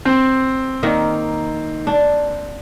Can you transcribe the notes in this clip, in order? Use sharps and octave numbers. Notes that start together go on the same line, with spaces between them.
C4
D#3 A#3 D#4
D4